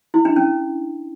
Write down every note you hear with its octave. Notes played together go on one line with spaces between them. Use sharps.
E4
D4
C#4